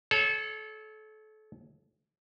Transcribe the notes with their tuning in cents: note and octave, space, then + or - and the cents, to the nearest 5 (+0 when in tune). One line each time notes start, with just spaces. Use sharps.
A4 -30 C#5 +0